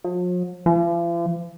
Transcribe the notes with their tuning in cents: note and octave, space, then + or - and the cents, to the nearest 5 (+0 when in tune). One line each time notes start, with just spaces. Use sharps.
F3 +45
F3 -45